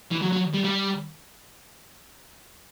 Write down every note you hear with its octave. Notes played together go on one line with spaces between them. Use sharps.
E3
F#3
F#3
G3
G3